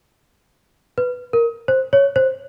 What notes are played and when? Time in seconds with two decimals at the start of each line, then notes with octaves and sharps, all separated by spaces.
0.98 B4
1.33 A#4
1.68 C5
1.93 C#5
2.16 C5